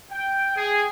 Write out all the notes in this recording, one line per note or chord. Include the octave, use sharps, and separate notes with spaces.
G5
G#4